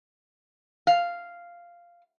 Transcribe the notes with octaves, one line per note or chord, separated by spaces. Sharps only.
F5